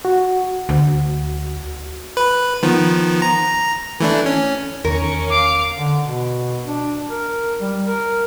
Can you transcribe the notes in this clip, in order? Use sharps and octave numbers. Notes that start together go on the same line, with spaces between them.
F#4
D2
B4
D#3 F3 B3
A#5
E3 A3 D4
C#4
E2 D#3 C#4 A#4 C#6
F5 D6
D3
B2
D4
A#4
G3
A#4